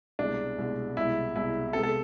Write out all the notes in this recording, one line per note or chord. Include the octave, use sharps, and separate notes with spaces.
C2 B2 G#3 D4
C2 B2 G#3
C2 B2 G#3 E4
C2 B2 G#3 E4
C3 G#3 B3 A4
A4